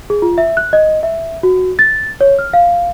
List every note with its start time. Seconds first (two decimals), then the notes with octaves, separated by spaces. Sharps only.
0.10 G#4
0.22 F4
0.38 E5
0.57 F#6
0.73 D#5
1.03 E5
1.43 F#4
1.79 A6
2.21 C#5
2.39 F6
2.54 F5